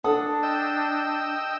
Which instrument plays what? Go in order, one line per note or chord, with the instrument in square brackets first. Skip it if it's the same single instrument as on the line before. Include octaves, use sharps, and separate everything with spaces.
[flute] D4 [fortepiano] A4 F#5 D#6
[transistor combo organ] D#5 G5 E6